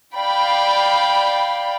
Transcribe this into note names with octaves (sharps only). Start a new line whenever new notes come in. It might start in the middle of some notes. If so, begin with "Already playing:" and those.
D5 F5 G5 B5